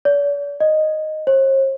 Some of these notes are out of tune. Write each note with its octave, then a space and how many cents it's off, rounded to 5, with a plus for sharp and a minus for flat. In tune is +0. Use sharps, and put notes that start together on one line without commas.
D5 -45
D#5 -5
C5 +45